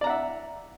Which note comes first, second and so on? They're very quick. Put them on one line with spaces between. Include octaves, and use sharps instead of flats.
D5 A#5 F#5 E5